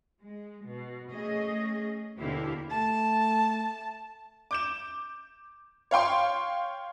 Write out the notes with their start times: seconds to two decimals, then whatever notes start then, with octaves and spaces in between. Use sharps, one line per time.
0.23 G#3
0.67 B2
1.11 A3 C#4 G#4 D#5
2.19 D#2 B2 D3 E4 G4 F5
2.71 A3 A5
4.51 D6 G6 E7
5.91 C#5 F5 G5 C6